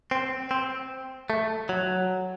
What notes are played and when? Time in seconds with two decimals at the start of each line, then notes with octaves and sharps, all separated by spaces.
0.11 C4
0.51 C4
1.30 A3
1.69 F#3